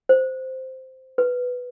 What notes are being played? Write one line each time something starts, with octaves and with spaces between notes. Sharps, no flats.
C5
B4